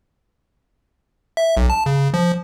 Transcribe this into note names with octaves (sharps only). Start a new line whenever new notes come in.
E5
B1
A5
C#3
F3